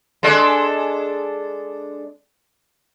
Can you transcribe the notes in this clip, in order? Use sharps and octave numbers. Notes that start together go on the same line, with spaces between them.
G#3 D4 A4